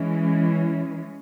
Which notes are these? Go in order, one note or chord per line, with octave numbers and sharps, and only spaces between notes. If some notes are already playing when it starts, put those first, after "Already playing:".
Already playing: E3 G#3 C#4